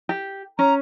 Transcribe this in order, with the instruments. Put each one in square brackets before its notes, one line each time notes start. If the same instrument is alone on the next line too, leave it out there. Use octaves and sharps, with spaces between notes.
[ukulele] G4
[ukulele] C#4 [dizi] A#5